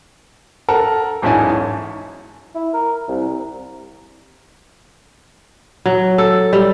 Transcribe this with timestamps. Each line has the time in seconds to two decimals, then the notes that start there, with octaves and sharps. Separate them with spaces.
0.69 A4 A#4 F#5 A5 A#5
1.22 E1 B1 G#2 C#4 E4 G#5
2.55 E4
2.74 A#4
3.08 C2
5.86 F#3
6.18 A4
6.53 G3